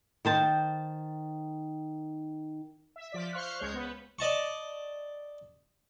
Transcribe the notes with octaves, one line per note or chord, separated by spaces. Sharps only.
D#3 C5 A5
E5
F3 D5 B6
C5 F5 C6 C#6 F6 F#6
C#2 G#3 C#5 G6
B3 B4
D5 D#5 A5 C#6